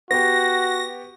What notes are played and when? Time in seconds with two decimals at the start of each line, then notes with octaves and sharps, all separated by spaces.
0.11 B3 F#4 G4 A#6